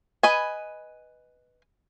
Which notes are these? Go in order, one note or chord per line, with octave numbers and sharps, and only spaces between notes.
B4 D#5 G#5